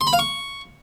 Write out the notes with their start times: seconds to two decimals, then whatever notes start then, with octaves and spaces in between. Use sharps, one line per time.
0.01 C6
0.07 B5
0.13 F5
0.19 C#6